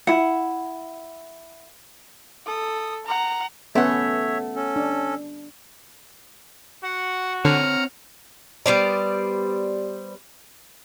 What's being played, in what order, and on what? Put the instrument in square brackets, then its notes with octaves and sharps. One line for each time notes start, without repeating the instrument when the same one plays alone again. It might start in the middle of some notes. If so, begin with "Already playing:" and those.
[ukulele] E4 F#5
[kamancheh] A4 D#6
F#5 A#5
[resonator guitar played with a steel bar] A3 F#5 [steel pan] B3 C#4 [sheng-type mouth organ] C#5 E5
[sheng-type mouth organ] C#4 A4
[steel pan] D4
[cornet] F#4 [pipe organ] F#5
[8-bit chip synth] D3 [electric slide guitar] C4 C#5 [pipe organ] F#5 A#5 F6
[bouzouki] G3 B3 C5 D5